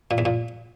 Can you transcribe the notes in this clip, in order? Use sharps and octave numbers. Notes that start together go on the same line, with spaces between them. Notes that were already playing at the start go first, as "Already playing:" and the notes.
A#2
E2
A#2